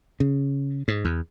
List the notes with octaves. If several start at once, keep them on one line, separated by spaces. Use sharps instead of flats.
C#3
G#2
E2